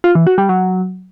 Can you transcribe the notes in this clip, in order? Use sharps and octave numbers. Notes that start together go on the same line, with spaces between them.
F4
E3
F#4
G3
F#3